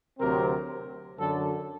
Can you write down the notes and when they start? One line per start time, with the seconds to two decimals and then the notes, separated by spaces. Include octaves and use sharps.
0.19 D2 C3 F#3 C4 A#4
1.18 F#2 D3 F#3 A4